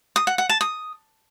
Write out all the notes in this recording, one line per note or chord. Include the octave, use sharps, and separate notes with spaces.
D#6
F#5
F#5
A5
D#6